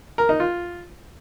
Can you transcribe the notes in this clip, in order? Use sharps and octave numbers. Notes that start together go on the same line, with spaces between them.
A#4
D#4
F4